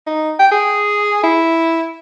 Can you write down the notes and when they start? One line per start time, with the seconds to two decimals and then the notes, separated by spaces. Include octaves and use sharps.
0.06 D#4
0.39 G5
0.51 G#4
1.23 E4